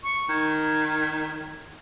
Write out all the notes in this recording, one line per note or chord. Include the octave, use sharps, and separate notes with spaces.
C#6
D#3 G#6